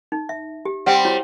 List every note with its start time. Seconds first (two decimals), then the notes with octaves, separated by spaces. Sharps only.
0.12 D#4
0.29 E5
0.65 G4
0.86 G3 C4 F#5 G5
1.05 E4 F#4 C#5